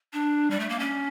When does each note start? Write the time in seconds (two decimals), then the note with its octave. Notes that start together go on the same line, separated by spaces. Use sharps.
0.13 D4
0.51 G3
0.60 A3
0.69 A#3
0.79 C#4